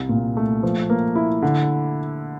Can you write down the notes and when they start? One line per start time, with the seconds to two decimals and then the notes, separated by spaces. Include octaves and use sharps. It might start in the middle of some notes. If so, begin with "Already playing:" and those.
Already playing: C2
0.09 A#2
0.37 A3
0.63 F3
0.90 A#3
1.15 E4
1.42 D3